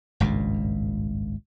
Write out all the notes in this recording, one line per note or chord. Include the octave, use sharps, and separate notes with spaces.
G#1 C#2 G2 A#2